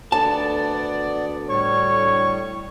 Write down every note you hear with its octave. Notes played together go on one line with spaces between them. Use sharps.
D2 B3 D4 A4 D5 A5
A2 G3 C#5 C#6